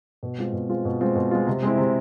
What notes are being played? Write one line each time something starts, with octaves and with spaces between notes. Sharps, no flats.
B2
G#3 C4 F4
B2
G#3 C4 F4
B2
G#3 C4 F4
B2
G#3 C4 F4
C3
G#3 C4 E4
C3